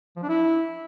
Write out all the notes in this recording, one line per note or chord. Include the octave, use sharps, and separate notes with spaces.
F3
D4
E4